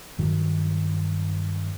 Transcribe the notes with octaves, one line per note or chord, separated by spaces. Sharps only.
G2 D#3 F#3